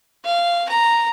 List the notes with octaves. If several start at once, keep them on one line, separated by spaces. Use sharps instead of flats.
F5
A#5